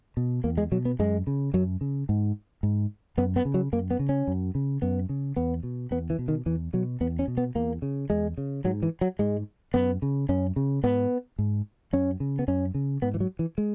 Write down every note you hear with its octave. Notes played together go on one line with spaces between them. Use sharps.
B2
E2 A#3
G#3
B2 F#3
B3
F#2 G#3
C#3
F#2 F#3
C#3
G#2
G#2
F#2 B3
B3
C#3
F#3
F#2 A#3
B3
C#3
C#4
F#2
C#3
F#2 B3
C#3
E2 B3
B2
E2 B3
E3
B2
D#3
E2 E3
B2 F#3
E2 B3
C#4
B2
B3
E2 A#3
C#3
E2 G#3
C#3
G#2 F#3
E3
F#3
G#2 G#3
F#2 B3
C#3
F#2 C#4
C#3
G#2 B3
G#2
F#2 C#4
C#3
B3
F#2 C#4
C#3
G#2 B3
E3
F#3
E3
G#3